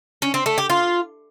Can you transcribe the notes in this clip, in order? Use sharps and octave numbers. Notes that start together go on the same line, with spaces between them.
C#4
C4
A3
G4
F4